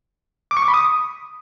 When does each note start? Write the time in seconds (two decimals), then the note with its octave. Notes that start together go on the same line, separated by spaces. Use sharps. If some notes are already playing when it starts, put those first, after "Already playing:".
0.51 D6
0.57 C#6
0.62 D6
0.68 B5
0.74 D#6